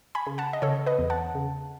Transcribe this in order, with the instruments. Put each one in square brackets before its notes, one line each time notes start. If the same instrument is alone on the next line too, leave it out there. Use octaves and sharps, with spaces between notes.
[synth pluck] G#5 B5
C#3
F#5 A5
D#5
C#3 A4 C#5
B4 D#5
E2
F#5 A5
C#3